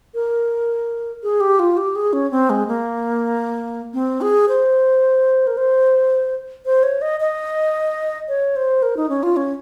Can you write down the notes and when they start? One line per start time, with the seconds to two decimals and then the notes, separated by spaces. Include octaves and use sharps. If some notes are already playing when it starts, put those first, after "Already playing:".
0.14 A#4
1.23 G#4
1.41 G4
1.59 F4
1.77 G4
1.95 G#4
2.13 C#4
2.31 C4
2.50 G#3
2.68 A#3
3.94 C4
4.21 G#4
4.49 C5
5.47 A#4
5.57 C5
6.66 C5
6.83 C#5
7.02 D#5
7.20 D#5
8.28 C#5
8.56 C5
8.83 A#4
8.97 D#4
9.09 C#4
9.23 F4
9.36 C#4